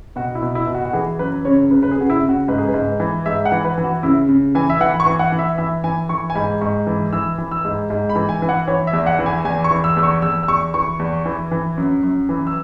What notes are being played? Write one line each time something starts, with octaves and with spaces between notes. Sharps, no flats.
B2 F#4
E4
B2
E4
B2
F#4
F#4
E3 G#4
F#2 B4
C#3 C#5
C#3 B4
B4
G#4
C#3 F#4
E4
C#3
F#4
G#2 B4
G#4
B4
G#2
E3
G#2 E5
F#5
E3
B4
E3
F#4
C#3 E4
C#3
E3 G#5
E5
E3 F#5
B5
C#6
E3
F#5
E3
E5
E3 E5
E3 G#5
E3 C#6
G#5
G#2 B5
G#2 C#6
E3
E3 E6
E3
E6
G#2
G#2
B5
E3
G#5
E3
F#5
E3 C#5
E5
E2
F#5
E3
G#5
E2 G#5
C#6
E3
E6
E2 E6
C#6
E2 E6
E6
E2 C#6
E3 C#6
E2
E3
E3
F#2
F#2
E3
E6